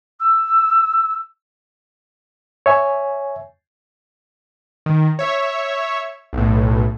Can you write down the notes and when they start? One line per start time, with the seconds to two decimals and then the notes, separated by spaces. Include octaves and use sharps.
0.20 E6
2.66 C#5 E5 G#5
4.86 D#3
5.19 C#5 E5
6.33 B1 A2